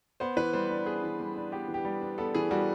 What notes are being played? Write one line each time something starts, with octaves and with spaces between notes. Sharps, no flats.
B3 C5
E3 B4
G3 C5
D4
B3 G#4
E3
G3
D4
B3 G4
E3
G4
G3
D4
B3 A4
E3 G#4
G3 F#4